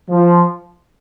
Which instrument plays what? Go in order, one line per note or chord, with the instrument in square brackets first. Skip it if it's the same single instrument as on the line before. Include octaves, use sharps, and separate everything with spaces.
[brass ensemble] F3